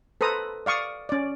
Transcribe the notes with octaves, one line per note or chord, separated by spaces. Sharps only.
A4 B4 C5 A#5 D#6
D5 F5 C#6 D#6
C#4 D5